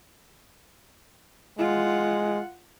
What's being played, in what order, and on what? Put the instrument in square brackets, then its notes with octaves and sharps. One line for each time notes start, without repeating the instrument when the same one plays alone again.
[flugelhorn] G#3 [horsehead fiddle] F4 F#5